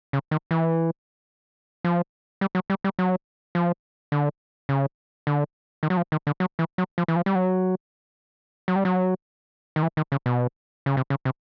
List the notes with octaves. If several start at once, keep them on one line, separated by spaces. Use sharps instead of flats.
C#3
D#3
E3
F3
G3
F#3
G3
G3
F#3
F3
D3
C#3
D3
D#3
F#3
F3
D#3
D3
F#3
E3
F#3
F3
E3
F3
G3
F#3
F#3
G3
F#3
D#3
E3
D#3
C#3
B2
C#3
C3
C#3
C3